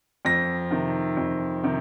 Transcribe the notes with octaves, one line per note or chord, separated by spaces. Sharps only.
F2 A#6
C3 D#3
F2
C3 D#3